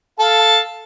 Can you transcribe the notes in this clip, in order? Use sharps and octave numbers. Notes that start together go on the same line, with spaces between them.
A4 F5 A5